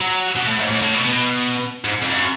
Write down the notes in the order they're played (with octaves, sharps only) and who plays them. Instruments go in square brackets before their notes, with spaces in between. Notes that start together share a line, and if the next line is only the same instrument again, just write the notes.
[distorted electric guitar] F#3
B2
A2
G#2
A2
A2
B2
B2
G#2
F2
F#2